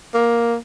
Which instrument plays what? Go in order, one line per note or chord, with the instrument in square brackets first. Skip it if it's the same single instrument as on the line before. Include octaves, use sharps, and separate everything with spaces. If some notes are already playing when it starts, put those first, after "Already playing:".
[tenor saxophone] A#3